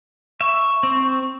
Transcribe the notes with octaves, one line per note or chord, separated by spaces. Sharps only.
E5 C#6
C4